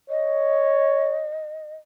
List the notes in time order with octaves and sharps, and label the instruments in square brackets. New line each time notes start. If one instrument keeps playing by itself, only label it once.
[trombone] C#5 [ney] D#5